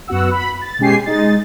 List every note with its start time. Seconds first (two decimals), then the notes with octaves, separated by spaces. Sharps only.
0.08 F#2 B3 F#4 F#5 E6
0.31 B5
0.61 A6
0.79 B2 G#3 C#4 G4 G#5 C7
1.06 G#3 D#4 D#5 A6